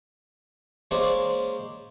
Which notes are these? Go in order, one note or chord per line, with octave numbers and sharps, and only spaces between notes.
G#3 A#3 C#4 C5 D5